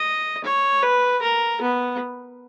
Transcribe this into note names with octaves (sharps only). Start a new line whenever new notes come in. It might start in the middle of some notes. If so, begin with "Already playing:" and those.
Already playing: D#5
C#5
B4
A#4
B3